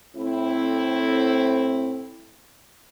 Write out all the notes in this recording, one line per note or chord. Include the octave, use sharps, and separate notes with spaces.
A2 C4 E4